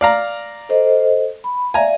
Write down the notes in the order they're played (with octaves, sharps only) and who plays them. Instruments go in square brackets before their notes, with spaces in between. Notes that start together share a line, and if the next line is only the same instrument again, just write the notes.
[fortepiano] D5 F5 A#5
[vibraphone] A4 C5 D#5
B5
[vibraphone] D5 E5 F5 [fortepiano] G#5 A#5